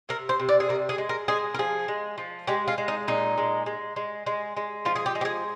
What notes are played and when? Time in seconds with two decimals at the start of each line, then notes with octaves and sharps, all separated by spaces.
0.09 C3 A#4
0.29 C5
0.39 C3
0.49 D5
0.60 G#4
0.69 C3 A#4
0.89 G#4
0.98 G#3
1.09 A#4
1.28 G#3 G#4
1.54 A#4
1.59 F3 G#4
1.88 G#3
2.18 F3
2.47 G#3 G4
2.68 F4
2.78 G#3
2.88 D#4
3.08 A#2 D#4
3.38 G#3
3.66 G#3
3.96 G#3
4.26 G#3
4.57 G#3
4.85 F3 F4
4.96 G#4
5.06 G4
5.15 G#3
5.21 G4
5.25 G#4